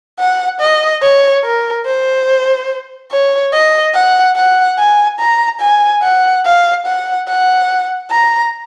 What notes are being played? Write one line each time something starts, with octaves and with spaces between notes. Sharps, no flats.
F#5
D#5
C#5
A#4
C5
C#5
D#5
F#5
F#5
G#5
A#5
G#5
F#5
F5
F#5
F#5
A#5